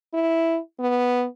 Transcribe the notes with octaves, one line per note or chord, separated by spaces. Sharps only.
E4
B3